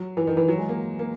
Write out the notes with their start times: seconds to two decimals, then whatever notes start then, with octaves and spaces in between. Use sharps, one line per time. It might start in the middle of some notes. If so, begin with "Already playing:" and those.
Already playing: F#3
0.17 E3
0.27 D#3
0.37 E3
0.48 F#3
0.58 G#3
0.69 A#3
0.99 A#3